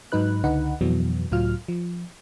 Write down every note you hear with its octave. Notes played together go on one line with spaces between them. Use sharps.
G#2 F#3 D#4 B4 F#6
C#2 D3 D#4 B4 F#5
F2 B2 E3 F#3 B3
C#2 A2 F#3 F4 F6
F3